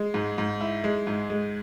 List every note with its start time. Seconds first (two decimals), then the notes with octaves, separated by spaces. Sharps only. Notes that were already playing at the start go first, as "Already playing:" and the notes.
Already playing: G#3
0.14 G#2
0.38 G#2
0.61 E4
0.84 G#3
1.07 G#2
1.30 G#3